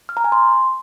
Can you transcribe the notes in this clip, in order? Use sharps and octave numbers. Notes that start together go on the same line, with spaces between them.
F6
A#5
G#5
C6